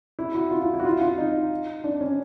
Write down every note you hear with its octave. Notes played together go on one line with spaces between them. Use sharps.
E4
F#4
F4
F4
E4
F#4
F4
F4
D#4
D4
C#4